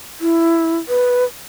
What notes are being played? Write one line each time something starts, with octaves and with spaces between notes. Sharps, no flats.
E4
B4